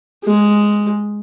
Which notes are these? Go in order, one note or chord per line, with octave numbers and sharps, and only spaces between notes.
G#3